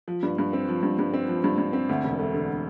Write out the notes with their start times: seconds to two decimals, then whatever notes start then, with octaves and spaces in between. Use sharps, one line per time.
0.08 F3
0.23 G2
0.38 G2
0.53 C4
0.68 F3
0.83 G2
0.99 G2
1.14 C4
1.28 F3
1.44 G2
1.58 G2
1.73 C4
1.89 D2
2.04 E1
2.19 A3
2.34 D3